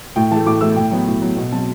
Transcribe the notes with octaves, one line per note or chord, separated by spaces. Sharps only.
A2 G5
E3 A3 A5
A2 D6
E3 A3 E6
A2 G5
F#3 B3
A2
F#3 B3
B2
F#3 C4 A5